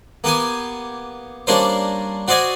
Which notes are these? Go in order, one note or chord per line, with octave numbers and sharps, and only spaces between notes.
A#3 B3 G4 G#5
G3 A#3 C#4 D4 A#4 C5
F#4 C5 D5 D#5 G#5